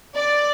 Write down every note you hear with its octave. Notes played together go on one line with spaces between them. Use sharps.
D5